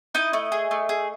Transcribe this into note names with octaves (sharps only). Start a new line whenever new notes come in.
D#4 E4 D#5
A3
G#4
A3
G#4